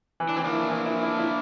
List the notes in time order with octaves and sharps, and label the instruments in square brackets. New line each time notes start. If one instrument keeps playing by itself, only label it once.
[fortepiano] E3
[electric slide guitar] D4
[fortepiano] E3 [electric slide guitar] C4
[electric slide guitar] A#3 D4
[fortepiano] E4
E3
E4
E4
E4